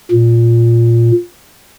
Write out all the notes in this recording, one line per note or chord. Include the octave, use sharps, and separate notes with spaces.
A#2